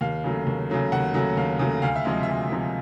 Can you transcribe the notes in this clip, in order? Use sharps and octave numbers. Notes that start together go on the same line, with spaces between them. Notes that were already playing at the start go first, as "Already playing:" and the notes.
D#2 F5
C#3 F#3 A3
D#2
C#3 F#3 A3
D#2 F#5
C#3 F#3 A3
D#2 F5
C#3 F#3 A3
D2 F5
E5
C3 F3 G#3 D#5
E5
D2
C3 F3 G#3